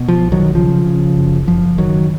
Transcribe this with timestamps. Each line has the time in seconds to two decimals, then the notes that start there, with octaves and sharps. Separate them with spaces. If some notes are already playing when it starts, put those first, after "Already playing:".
Already playing: B2
0.08 F3
0.24 B1
0.32 D#3 F#3
0.55 C#3 F3
0.86 C#3
1.17 F#1
1.47 F#1 F3
1.78 F#2 D#3 F#3